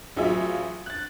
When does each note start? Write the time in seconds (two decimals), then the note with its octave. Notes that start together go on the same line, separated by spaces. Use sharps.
0.17 A1 F#3 F4 G#4 E5 G#5
0.86 F#6 A6